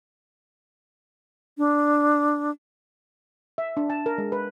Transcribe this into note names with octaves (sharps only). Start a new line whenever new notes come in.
D4
E5
D4
A5
A#4
G#3
B4